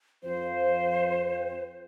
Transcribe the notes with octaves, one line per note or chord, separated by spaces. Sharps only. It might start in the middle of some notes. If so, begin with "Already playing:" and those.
F2 F3 C4 F4 C5